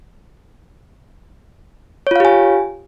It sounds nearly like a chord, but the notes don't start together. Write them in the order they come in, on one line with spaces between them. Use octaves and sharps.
C#5 F4 F5 G4 G#5